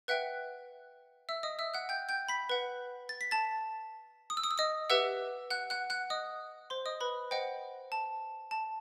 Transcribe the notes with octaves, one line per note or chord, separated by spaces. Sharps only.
B4 E5 F#5 G5 F#6
E5 E6
D#5 D#6
E5 E6
F#5 F#6
G5 G6
G5 G6
B5 B6
B4 F#5
A6
B6
A5 A6
D#6
E6
D#6
E6
D#5 D#6
G4 B4 E5 F#5 E6
F#5 F#6
F#5 F#6
F#5 F#6
D#5 D#6
C5 C6
D#5 D#6
B4 B5
C5 D#5 F#5 G5
A5
A5